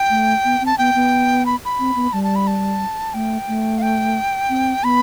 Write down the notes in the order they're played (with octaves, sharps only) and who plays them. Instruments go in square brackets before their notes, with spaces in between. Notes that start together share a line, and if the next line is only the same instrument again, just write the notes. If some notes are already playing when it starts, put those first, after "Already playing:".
Already playing: [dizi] G5
[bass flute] A3
B3
[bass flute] C4 [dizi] A5
[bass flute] B3 [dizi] G5
[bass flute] B3
[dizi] B5
B5
[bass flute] C4
B3
[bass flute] G3 [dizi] A5
[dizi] A5
B5
A5
[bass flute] A3 [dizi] G5
[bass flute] A3
[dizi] F5
G5
[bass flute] C4
[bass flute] B3 [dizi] B5